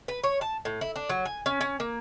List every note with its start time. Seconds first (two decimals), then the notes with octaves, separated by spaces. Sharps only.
0.08 B4
0.23 C#5
0.41 A5
0.65 A2
0.81 E4
0.96 D4
1.09 F#3
1.25 G#5
1.46 C#4
1.61 C#4
1.80 A#3